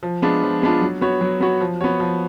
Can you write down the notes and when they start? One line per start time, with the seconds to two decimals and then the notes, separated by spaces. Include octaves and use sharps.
0.03 F3
0.22 G#3 B3 D4 F4
0.43 F3
0.62 G#3 B3 D4 F4
0.81 F#3
1.01 B3 F#4 C#5
1.21 F#3
1.40 B3 F#4 C#5
1.61 F3
1.81 B3 F#4 C#5
2.00 F3